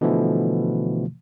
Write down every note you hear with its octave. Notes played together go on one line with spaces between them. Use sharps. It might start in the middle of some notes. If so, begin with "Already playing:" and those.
B2 D3 E3 F3 A3